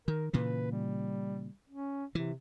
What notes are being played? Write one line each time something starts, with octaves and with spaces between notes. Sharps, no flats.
D#3 A#4
A#2 C#3 E3 B4
G3
C#4
C3 E3